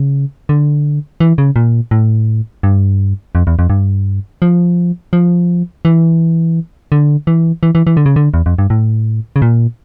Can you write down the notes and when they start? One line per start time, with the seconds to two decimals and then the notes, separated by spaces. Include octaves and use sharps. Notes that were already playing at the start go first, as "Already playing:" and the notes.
Already playing: C#3
0.49 D3
1.20 E3
1.38 C#3
1.56 A#2
1.91 A2
2.63 G2
3.35 F2
3.47 E2
3.59 F2
3.70 G2
4.42 F3
5.13 F3
5.85 E3
6.92 D3
7.27 E3
7.63 E3
7.75 E3
7.87 E3
7.97 D3
8.06 C#3
8.16 D3
8.34 E2
8.46 F2
8.59 G2
8.70 A2
9.36 C#3
9.42 A#2